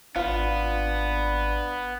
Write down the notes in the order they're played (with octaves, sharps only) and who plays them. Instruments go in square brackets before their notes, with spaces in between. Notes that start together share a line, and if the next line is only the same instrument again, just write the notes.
[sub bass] G#1 [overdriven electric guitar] B3 [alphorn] D4 [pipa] F4